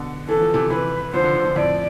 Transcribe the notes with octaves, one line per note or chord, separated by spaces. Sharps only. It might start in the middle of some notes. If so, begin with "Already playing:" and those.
Already playing: B2 D3
E3 A4
F3
C3 E3
C3 E3 B4
D3 F3 C5
D3 F3
D3 F3
D3 F3
F2 A2 D5